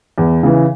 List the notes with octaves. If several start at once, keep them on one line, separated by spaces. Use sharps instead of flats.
E2
C#3 E3